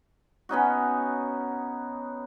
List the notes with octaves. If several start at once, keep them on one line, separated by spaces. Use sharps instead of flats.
B3 C#4 D#4 F#4